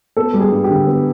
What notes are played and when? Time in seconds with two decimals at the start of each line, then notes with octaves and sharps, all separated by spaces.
0.17 B3 A4
0.34 G3
0.40 G#4
0.52 G2
0.64 G4
0.70 D3
0.87 B3